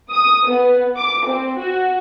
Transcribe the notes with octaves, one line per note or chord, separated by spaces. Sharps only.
D#6
B3
D6
C4
F#4